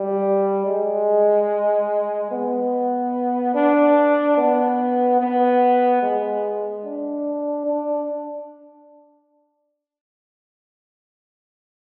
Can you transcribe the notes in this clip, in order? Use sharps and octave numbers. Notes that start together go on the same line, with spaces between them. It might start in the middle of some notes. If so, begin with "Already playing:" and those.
Already playing: G3
G#3
B3
D4
B3
B3
G#3
D4
D4